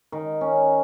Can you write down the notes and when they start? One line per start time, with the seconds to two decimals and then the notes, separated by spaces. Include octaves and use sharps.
0.12 D#3
0.41 C#4